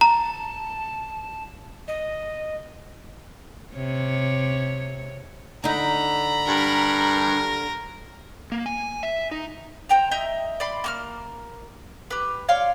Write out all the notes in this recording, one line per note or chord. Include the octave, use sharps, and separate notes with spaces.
A5 A#5
D#5
C3 C#5
D3 D#4 A#5 B5
G2 A#4
A#3
G#5
E5
D#4
C5 G5 A#5
D#5 E5 A#5 G6
D5 B5 C6
A#3 C#6 F6
G4 B4
C#5 D5 F5 C6